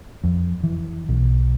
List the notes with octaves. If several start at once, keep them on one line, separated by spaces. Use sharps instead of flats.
F2
E3
B1